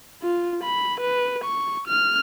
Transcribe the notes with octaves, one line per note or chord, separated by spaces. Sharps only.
F4
B5
B4
C#6
F6